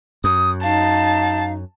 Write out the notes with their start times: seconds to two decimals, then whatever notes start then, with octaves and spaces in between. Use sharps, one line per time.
0.24 F#2 D#6
0.63 D#4 F5 A5